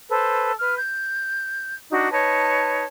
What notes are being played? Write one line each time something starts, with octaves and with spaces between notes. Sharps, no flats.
A4 B4 C5
B4 F6
G6
D4 D#4 F#4
D#4 B4 C#5 A5